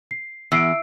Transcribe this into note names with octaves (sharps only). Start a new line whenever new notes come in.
C7
E2 E6 C7 D7